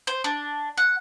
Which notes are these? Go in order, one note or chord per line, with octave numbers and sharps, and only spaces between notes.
C5
D4
F#5